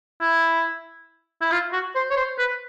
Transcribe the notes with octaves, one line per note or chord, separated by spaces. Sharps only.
E4
E4
F4
F#4
C5
C#5
C5
B4